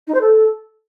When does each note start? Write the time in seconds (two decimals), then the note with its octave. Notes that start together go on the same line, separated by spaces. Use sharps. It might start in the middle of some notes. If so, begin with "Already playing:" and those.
0.07 D#4
0.14 C5
0.21 A4